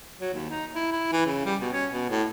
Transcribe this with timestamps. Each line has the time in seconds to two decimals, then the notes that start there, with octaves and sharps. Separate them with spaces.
0.21 F#3
0.33 D#2
0.50 D#4
0.75 E4
0.92 E4
1.12 E3
1.26 C#3
1.45 G3
1.61 B2
1.73 C#4
1.91 B2
2.10 A2